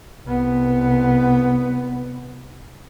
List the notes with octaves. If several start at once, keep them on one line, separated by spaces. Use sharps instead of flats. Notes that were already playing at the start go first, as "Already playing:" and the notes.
C2 B3